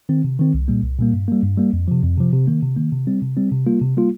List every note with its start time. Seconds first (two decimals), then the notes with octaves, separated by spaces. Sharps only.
0.09 D#3 C4
0.24 C3
0.39 D#3 C4
0.54 C2
0.68 A#2 G3 A#3
0.84 C2
0.98 A#2 G3 A#3
1.13 G2
1.28 G3 A#3
1.43 G2
1.57 G3 A#3
1.73 F2
1.88 C3 F3
2.03 F2
2.17 C3 F3
2.33 C3
2.47 D#3 A#3
2.63 C3
2.77 D#3 A#3
2.93 C3
3.07 G3 C4
3.22 C3
3.37 G3 C4
3.52 C3
3.66 G3 A#3 F4
3.81 C3
3.97 G3 A#3 F4